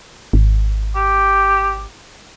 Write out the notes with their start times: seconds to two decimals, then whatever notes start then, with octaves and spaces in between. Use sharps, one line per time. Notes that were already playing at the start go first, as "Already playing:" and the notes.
0.33 G#1
0.96 G4